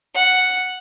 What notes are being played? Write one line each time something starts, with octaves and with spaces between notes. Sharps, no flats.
F#5